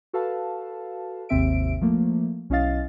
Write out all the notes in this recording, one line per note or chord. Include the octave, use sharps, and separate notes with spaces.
F#4 A4 B4 F5 A5
G#1 D#2 C3 C4 E5 D7
F3 A3 A#3
B1 C#4 E4 D#5 F5 A6